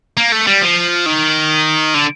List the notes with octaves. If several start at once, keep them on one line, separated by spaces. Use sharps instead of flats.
A#3
A3
G3
F3
D#3
D3